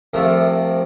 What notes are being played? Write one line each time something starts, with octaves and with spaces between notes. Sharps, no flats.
C2 C3 F3 A3 A#4